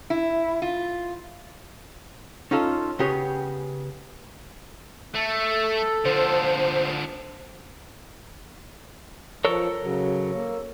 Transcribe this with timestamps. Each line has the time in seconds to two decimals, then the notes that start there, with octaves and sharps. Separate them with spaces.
0.10 E4
0.62 F4
2.51 C#4 D#4 F4 A4
2.99 C#3 B3 G4 G#4 C#5
5.14 A3 A4
6.05 D3 F3 C5
9.45 F3 A4 A#4 C#5
9.82 C#3 F#3
10.34 A#3